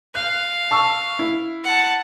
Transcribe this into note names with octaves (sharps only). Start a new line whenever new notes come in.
F5 F#6
A5 C#6 E6
E4
F#5 A5